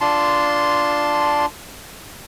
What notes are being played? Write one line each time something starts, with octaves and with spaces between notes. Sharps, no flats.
D4 F4 A5 C6